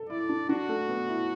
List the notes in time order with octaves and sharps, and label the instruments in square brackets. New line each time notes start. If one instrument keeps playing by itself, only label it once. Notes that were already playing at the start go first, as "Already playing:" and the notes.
Already playing: [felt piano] A4
[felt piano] E4 [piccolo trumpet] D5
[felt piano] D4
[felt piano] D4 [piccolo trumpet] F#4
[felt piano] A3
B3
E4